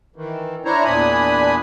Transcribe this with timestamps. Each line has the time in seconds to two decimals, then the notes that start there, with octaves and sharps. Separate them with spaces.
0.16 D#3 E3
0.65 D4 E4 C5 C#5 A#5
0.85 E2 A#2 D4 G#5 B5 D#6